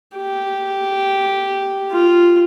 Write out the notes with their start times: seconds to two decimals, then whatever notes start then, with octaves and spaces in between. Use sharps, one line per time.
0.17 G4
1.92 F4